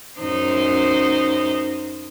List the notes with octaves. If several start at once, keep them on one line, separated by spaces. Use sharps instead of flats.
F#2 D#4 C5